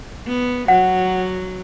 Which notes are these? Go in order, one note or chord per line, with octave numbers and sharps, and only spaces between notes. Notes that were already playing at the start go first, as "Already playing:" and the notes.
B3
F#3 F#5